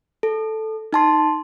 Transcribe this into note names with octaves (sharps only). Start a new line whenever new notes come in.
A4
D#4 A5 C6